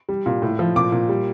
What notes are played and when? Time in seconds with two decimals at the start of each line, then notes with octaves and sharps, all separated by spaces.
0.09 G3
0.26 A#2
0.42 A2
0.59 F3
0.76 A#2 D6
0.92 A#2
1.09 G3